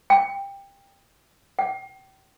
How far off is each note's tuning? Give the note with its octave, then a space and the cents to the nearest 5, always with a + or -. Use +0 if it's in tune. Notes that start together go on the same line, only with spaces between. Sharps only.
G5 +10
G5 -30